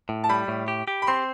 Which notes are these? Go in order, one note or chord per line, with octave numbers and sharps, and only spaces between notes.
A2
A5
G3 B5
A2
G4
G4
B5
C4 C6